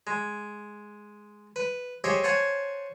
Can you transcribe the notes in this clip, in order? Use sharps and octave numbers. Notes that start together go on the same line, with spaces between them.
G#3
B4
G4 G#4 C5 C#5 D#5 E5
C5 C#5 F#5 G#5 A5